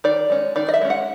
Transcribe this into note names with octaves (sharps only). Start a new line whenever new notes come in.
D#3 D5
G#3 C#4
D#3 D5
D#5
E5
G#3 C#4
F#5